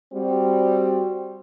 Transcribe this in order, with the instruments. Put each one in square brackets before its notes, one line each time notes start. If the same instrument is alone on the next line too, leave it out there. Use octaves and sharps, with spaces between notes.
[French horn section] G3 C4 F#4